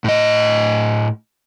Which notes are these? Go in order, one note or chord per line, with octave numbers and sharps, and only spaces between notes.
A2 D#5